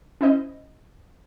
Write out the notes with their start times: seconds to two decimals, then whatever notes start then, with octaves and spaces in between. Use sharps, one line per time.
0.21 C#4 E4 C5 D#5